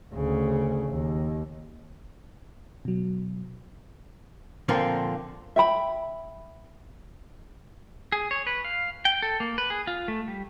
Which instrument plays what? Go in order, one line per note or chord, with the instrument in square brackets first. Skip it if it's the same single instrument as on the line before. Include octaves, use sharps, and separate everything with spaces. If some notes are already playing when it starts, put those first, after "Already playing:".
[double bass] D2 C#3
D#2
[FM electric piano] B2 F#3
[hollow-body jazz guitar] A#2 D3 F3 A#3 C4
[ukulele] E5 G5 B5
[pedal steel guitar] G#4
C#5
B4
F5
G5
A4
A#3
B4
G#4
F4
A3
G3